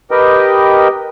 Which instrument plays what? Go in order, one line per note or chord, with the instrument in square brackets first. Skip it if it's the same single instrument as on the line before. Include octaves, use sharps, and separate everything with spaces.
[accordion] G4 A#4 B4 D#5 G5